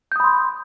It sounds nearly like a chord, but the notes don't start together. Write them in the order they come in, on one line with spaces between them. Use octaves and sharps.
G6 D#6 B5 C6